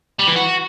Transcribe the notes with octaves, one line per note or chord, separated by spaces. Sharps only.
G3
E3
F#4